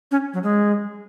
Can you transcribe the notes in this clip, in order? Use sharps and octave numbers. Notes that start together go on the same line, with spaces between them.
C#4
F#3
G#3